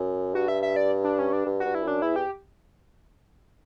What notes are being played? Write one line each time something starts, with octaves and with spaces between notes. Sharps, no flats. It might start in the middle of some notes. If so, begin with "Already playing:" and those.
Already playing: F#2
G2 F#4
E5
E5
D5
D4
C#4
D4
G2
G2 F#4
E4
F#2 D4
E2 E4
G4